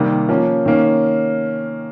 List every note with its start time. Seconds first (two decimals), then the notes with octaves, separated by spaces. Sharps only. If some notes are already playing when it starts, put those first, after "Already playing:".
Already playing: C3 D#3 G3 A#3
0.29 F3 A#3 C#4
0.66 D#3 A#3 C#4